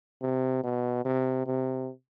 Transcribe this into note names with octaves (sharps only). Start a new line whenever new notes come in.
C3
B2
C3
C3